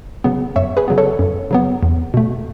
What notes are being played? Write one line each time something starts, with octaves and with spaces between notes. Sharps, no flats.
C#3 F#3 B3
F#2 C#5 E5
G#4 B4
C#3 F#3 B3
A4 C#5
F#2
C#3 F#3 B3
E2
B2 A3